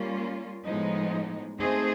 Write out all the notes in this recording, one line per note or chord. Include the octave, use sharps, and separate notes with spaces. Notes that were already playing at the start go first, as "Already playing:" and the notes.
Already playing: G3 A#3 C#4 F4
A2 F3 G#3 B3 D#4
A3 C4 D#4 G#4 C5